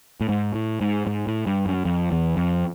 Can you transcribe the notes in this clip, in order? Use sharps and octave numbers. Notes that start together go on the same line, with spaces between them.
A2
G#2
A2
G#2
G#2
A2
G2
F#2
F2
E2
F2